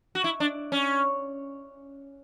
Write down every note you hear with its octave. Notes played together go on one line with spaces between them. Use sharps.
F#4
E4
D4
C#4